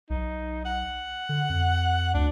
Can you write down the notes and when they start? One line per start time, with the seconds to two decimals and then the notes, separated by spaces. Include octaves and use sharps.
0.10 B1 D#4
0.65 F#5
1.29 D3
1.50 F2
2.14 D2 D4